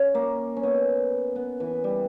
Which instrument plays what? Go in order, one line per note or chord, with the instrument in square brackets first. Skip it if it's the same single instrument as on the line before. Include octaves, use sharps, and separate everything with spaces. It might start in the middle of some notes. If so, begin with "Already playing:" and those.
Already playing: [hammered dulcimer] C#4
A#3
C#4
B3
B3
E3
G3